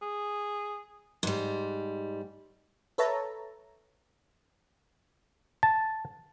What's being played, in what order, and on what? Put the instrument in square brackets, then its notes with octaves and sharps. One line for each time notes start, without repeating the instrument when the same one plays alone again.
[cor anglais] G#4
[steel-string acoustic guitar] G#2 G3
[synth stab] A4 B4 C#5 E5 A5 A#5
[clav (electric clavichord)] A5